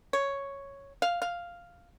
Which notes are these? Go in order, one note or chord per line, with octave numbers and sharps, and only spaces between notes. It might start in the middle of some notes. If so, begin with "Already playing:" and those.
C#5
F5
F5